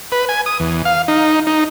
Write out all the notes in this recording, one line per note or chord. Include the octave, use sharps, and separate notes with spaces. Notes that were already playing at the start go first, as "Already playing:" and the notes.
B4
G#5
D#6
E2
F5
D#4
D#4